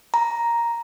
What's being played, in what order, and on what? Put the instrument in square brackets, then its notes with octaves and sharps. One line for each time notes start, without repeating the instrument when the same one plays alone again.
[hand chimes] A#5